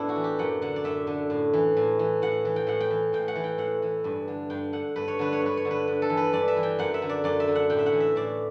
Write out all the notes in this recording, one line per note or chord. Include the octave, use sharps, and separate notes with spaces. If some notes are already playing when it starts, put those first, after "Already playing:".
Already playing: A2 B3 D4 E4
F#4
E3
G4
F#2 F#5
D3 F#5
D5
F#2 E5
D3
A2
E3
A2
E3
A2 F#5
E3
G5
A2 F#5
G5
E3
A2 G5
F#5
E3
G5
A2 F#5
E3
G2
D3
G2 G5
D3 F#5
G2 B4
C#5
D3 B4
C#5
G2 B4
C#5
D3
B4
G2
A4
E3
B4
G2 D5
E5
E3
G5
F#2 F#5
E5
D3
D5
F#2 D5
E5
D3
F#5
A2 G5
E5
F#5
E3
E5
A2 D5